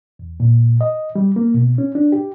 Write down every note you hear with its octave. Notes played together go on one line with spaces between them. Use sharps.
E2
A#2
D#5
G3
A#3
B2
C#4
D4
G4